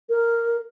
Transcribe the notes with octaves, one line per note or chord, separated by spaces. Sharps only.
A#4